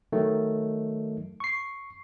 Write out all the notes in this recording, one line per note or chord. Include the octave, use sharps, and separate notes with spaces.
D#3 F#3 A3
C#6 C7